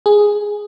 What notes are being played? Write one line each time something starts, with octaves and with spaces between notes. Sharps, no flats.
G#4